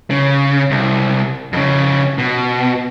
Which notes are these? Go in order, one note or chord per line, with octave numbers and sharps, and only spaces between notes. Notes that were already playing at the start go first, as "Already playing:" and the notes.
C#3
C2
F2 C#3
B2